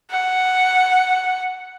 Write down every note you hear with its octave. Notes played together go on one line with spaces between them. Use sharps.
F#5